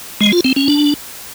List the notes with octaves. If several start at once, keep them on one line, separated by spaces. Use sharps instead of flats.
G#3
F4
C4
C#4
D4